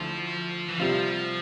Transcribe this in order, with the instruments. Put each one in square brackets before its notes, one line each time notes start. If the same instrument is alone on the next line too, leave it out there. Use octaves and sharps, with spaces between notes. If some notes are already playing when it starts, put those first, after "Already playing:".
Already playing: [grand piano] D2 D3 A3 E4 [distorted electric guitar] F3
[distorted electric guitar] E3
[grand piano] D2 C3 G3 C4 F4 [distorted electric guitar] F3